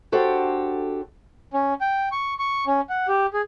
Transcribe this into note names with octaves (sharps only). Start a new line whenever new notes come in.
D4 F#4 G4 A4 C5
C#4
G5
C#6
C#6
C#4
F#5
G4
G#4